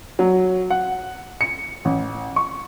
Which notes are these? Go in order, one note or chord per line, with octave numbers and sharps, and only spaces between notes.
F#3
F#5
C#7
A1
C#6